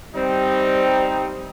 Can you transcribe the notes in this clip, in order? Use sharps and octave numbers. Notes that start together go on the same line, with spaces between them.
G3 C4 D#4